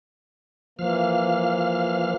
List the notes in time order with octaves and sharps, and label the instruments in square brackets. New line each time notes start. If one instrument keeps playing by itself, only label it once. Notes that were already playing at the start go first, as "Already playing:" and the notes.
[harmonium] E3 A#3 [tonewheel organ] F3 F5 F6